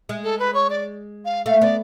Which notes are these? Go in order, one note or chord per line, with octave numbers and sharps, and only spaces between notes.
G#3
A4
B4
C#5
D5
F5
A3 F5
B3 D5